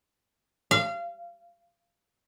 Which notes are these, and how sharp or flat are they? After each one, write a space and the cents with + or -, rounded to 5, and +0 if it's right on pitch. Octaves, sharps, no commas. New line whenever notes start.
F5 -25